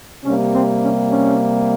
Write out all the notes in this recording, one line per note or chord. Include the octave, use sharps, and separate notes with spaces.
C3 G3 A#3 C#4
C4
C#4
C#4